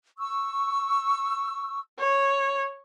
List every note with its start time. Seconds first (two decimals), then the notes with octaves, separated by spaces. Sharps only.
0.19 C#6 E6
1.99 C#5